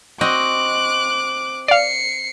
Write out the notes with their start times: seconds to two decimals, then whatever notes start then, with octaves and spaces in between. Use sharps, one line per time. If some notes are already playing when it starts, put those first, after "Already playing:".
0.21 C4 F#4 D#5 D6 F#6
1.68 D5 F5 C7 C#7